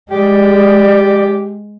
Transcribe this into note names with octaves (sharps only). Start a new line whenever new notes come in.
G#3 G4 D5